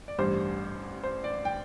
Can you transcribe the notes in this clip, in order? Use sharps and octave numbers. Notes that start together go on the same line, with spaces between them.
D5
A1 G2 G3 C5
C5
D5
G5